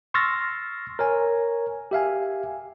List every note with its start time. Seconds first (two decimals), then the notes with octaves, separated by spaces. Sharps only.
0.14 C6 C#6 E6 F6 A6 A#6
0.99 A#4 C#5 G#5
1.91 G4 E5 F5 G#5